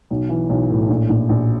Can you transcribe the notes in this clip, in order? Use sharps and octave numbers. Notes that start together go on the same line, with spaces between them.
B1
E3
B1
A2
A#1
A#1
A#1